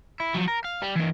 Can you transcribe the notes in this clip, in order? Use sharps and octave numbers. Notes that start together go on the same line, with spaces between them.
E4
F3 F#3
A#4
F5
G3
E3 A#3